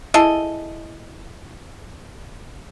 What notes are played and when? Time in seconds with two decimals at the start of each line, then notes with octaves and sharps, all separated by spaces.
0.14 E4 G#4 A4 D#5